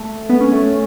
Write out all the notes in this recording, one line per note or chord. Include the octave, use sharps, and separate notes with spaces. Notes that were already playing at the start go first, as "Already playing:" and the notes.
Already playing: A3
B3
C#4
A3